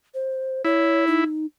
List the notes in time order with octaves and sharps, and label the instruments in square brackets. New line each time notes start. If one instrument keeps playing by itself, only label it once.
[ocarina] C5
[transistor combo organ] E4 [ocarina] C#5
[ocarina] D#4